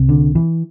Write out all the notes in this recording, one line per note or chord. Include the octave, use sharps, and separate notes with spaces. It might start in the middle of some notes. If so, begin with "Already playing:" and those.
Already playing: C2 C3
D3
E3